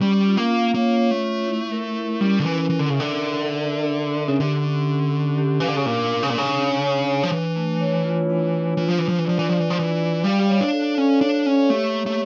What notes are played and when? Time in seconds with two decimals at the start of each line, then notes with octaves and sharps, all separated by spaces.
0.01 G3 C#4
0.26 F4
0.37 A#3
0.49 F4
0.74 A#3 C#5
0.99 C#5
1.11 A3
1.23 F4
1.48 E4
1.72 A#4
1.96 E4
2.21 G3 C#4
2.40 D3
2.44 E3 C#4
2.70 E3 A#4
2.79 D3
2.90 C#3 E5
3.00 D3
3.18 A#4
3.42 E5
3.66 D4
3.90 E5
4.15 D4
4.28 C#3
4.39 D3 G4
4.64 C#4
4.88 C#4
5.12 C#4
5.37 G4
5.60 E3 F5
5.68 D3
5.77 C#3
5.85 A#2 D4
6.10 D4
6.23 C#3
6.30 A#2
6.34 C#3 D4
6.59 D4
6.83 C#5
7.07 D4
7.23 F3
7.31 E3 D4
7.56 A3
7.80 C#5
8.05 F4
8.29 D4
8.53 D4
8.77 E3 F4
8.89 F3
8.98 E3 D4
9.08 F3
9.18 E3
9.26 F3 D5
9.39 E3
9.49 F3 D5
9.60 E3
9.70 F3
9.75 E3 D4
10.00 D5
10.24 G3 F5
10.48 C#5
10.61 D4
10.73 A4
10.97 C#4 A4
11.21 D4 C#5
11.45 C#4 C#5
11.70 A3 G4
11.94 A#3
12.06 A3